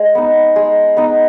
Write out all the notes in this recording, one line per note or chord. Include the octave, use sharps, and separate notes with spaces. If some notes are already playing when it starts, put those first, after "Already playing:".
Already playing: G#3
B3 D#4
G#3
B3 D#4